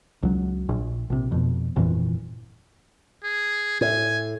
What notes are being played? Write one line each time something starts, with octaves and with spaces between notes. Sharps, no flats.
C#2 F#3
A#1
A#1 C3
F2 B2
G1 F2 A#2 E3
G#4
A2 G#5